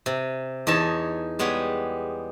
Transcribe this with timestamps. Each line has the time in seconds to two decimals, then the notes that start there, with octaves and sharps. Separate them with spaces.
0.06 C3
0.67 E2 D#4 C#5 A5
1.39 G3 G#3 B3 G4 C#5